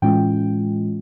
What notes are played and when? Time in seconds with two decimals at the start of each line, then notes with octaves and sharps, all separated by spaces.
0.02 A2 E3 G#3 C#4 F4 G5